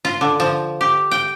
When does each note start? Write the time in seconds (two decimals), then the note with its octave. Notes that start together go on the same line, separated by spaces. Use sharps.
0.05 F4
0.21 D3
0.40 F3
0.81 G4
1.11 G5